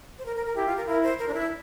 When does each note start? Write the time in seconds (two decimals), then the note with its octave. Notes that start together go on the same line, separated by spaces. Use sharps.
0.19 C5
0.25 A#4
0.36 A#4
0.46 A#4
0.56 E4 G4
0.66 F4
0.77 A#4
0.87 E4 A#4
1.03 C5
1.19 A#4
1.28 D4
1.34 E4